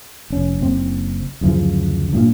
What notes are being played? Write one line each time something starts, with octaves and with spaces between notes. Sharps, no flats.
F1 C#4
F#1 C4
D1 F#2 C#3 F3
G2 A#2